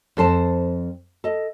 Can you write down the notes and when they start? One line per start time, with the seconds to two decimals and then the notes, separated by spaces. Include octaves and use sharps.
0.17 F2 A4 C5 A5
1.24 A4 D#5